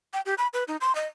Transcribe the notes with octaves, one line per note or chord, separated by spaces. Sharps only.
G5
G4
B5
B4
D#4
C6
D#5